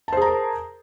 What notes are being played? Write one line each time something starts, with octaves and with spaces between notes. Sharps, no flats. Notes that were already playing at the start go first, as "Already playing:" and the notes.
G#4 A#4 C5 A5 A#5